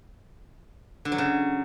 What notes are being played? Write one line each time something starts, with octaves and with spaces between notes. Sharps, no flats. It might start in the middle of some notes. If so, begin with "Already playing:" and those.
D3
F#3
C#3